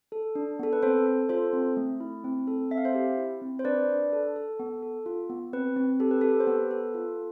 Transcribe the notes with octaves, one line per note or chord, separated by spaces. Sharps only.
A4
D4
B3 A4
B4
C4 A4 C5
A4
F4 A4 C5
C4
A3
E4
C4
A4
C4 E5
F5
C5 E5
G4
E4
C4
C5
D4 B4 D5
D4
A4
A4
B3
A4
F4
B3
C4 B4
C4
G4 A4
B4
G4 A4
C5
B3 B4
A4
F4